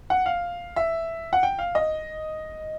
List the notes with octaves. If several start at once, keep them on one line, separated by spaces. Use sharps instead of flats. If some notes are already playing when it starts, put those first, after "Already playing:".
F#5
F5
E5
F#5
G5
F5
D#5